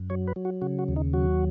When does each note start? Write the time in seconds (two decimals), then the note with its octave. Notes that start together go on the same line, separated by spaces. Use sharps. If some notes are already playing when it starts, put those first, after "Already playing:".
Already playing: F#2
0.10 F#3 C#5
0.28 B4
0.36 F#3
0.45 F#4
0.62 C#3 F#4
0.79 F#4
0.88 D#2
0.96 D#4
1.13 F#3 F#4